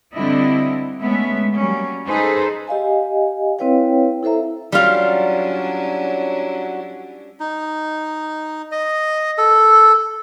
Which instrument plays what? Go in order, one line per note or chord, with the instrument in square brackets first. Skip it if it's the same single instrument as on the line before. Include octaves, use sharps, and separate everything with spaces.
[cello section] D3 G3 C4 D4 E4 D#5
G#3 A3 B3 C#4 E5
F#3 G3 A#3 C#4
D#4 G#4 A4 B4 C5
[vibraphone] G4 D#5 F5 G#5
C4 E4 B4 C#5 F5 G5
E4 A4 C5 E5 A#5
[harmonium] F#3 [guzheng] G3 F4 F5 [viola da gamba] C#4 D4 E4
[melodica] D#4
D#5
A4